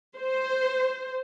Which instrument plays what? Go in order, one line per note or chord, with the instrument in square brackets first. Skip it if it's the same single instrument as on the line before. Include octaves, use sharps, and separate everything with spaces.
[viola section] C5